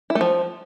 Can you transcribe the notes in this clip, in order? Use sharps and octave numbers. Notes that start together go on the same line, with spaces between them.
E4
A3
F3